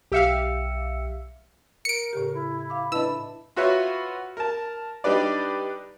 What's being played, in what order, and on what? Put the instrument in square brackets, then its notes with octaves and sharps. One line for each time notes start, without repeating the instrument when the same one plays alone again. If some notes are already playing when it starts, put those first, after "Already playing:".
[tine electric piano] B1 E6 C#7 [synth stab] G4 E5 F5
[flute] A#4 [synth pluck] C#7 D7
[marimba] A2 C#3 G4
[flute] E4
[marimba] F5 D6
[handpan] D4 E4 [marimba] B4 D#5 B5 [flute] A5 [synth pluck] E6
[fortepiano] F4 F#4 B4 C#5 E5 F#5
A#4 A5
G3 D4 D#4 G4 B4 D5